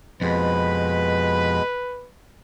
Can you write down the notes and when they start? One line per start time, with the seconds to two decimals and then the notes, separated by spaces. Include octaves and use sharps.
0.22 F2 B2 G#3 B4 B5